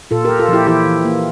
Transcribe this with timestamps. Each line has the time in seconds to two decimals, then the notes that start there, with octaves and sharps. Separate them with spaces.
0.11 A#2 F4 A4
0.25 A#3 G4 A#4
0.39 F4 A4
0.49 F3 E4 G4
0.67 E3 E4 G4
0.86 E3
1.05 A#3